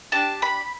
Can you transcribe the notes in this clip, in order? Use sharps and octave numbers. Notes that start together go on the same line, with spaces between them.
D4 G4 A5
B5